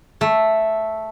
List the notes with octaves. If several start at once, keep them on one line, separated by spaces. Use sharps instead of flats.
A3